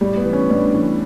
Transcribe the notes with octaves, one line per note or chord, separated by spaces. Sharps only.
A2 G3
B3
E3
C#4
A2 D4
E3